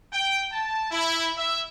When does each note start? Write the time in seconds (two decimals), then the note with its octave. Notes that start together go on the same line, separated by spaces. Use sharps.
0.12 G5
0.51 A5
0.91 E4
1.37 E5